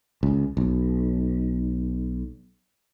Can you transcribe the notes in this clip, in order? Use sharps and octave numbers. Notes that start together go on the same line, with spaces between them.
C#2
B1